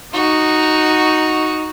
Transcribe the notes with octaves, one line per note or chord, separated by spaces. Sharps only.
D#4 F#4